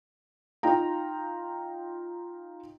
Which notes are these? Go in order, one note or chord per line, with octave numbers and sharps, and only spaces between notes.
D#4 F4 G5 A#5